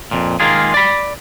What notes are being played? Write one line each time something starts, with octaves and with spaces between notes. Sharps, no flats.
F2 A#2
D#3 G#3 A#3 F4 G#4
D5 B5